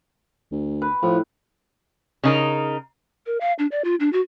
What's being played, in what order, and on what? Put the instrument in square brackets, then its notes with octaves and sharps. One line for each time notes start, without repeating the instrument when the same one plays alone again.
[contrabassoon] D2
[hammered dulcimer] B4
[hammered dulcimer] A2 [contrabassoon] F3
[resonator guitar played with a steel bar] C#3 D#4 A#4
[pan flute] A#4
F5
D4
D5
F4
D4
F#4